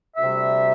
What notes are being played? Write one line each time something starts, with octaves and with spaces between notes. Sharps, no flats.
D2 C3 G3 C4 E5